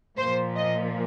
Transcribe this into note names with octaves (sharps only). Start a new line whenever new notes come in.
A#2 F3 C5
D#5